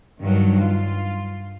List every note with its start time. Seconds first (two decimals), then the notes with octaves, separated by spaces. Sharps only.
0.20 G2 D#3 F#3
0.59 F4